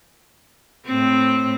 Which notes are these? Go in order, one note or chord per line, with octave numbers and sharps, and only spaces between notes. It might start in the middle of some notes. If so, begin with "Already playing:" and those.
A2 C4